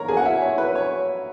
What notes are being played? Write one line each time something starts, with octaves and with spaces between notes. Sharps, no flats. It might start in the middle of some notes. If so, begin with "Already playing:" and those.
Already playing: G#2 E3 B3 A#4 C#5 A#5
G#4 G#5
F#5
E4 E5
C#5
B4
C#5